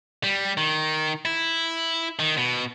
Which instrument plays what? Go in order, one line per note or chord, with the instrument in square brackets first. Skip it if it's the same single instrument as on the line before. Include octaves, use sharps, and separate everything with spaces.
[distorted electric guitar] G3
D#3
E4
D#3
B2